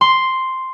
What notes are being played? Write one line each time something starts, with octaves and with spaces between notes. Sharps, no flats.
C6